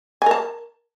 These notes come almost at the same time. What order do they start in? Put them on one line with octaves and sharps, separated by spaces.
G#5 A#4 A5